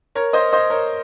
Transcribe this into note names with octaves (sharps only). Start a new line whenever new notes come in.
A#4 C#5
C5 D#5
C5 D#5
A#4 C#5